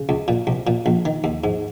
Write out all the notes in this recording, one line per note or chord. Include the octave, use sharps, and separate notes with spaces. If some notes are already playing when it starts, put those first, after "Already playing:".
Already playing: C#3
C#2
A#2
C2
A#2
A#1
D#3
D#2
G#2